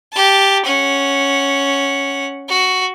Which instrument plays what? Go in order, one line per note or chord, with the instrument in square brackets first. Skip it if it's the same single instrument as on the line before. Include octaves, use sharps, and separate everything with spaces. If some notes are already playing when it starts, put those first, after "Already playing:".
[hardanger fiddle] G4 A5
C#4 F#5
F#4